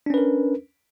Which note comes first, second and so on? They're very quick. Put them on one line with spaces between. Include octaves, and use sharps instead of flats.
D4 C#4 B4 A#4